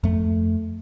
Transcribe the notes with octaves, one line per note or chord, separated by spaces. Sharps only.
F2 A3